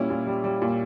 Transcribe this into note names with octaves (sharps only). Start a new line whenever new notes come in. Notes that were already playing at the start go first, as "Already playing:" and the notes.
Already playing: A#2 G3 C#4 E4
A#2
G3
G3
A#2